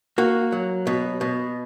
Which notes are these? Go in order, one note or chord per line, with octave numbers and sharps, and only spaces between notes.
A#3 F#4
F#3
B2
B2